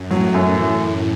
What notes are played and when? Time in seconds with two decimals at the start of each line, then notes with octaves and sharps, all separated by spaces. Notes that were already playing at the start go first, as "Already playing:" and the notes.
Already playing: F#2
0.10 A2 F#3
0.34 F#2
0.57 E3